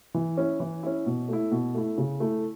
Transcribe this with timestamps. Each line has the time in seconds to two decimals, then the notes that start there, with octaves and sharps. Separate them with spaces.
0.14 E3
0.37 C#4 E4
0.60 E3
0.83 C#4 E4
1.06 B2
1.29 A3 E4
1.52 B2
1.75 A3 E4
1.98 C#3
2.20 A3 E4